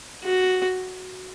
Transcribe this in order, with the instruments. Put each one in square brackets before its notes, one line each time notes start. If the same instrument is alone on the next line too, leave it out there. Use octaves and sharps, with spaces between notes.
[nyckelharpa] F#4